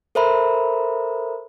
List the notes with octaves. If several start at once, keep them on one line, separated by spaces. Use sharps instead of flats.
A4 A#4 C5 E5 A#5 B5